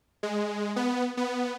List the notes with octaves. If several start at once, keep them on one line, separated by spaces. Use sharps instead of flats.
G#3
B3
B3